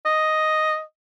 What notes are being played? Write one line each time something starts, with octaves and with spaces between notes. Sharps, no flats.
D#5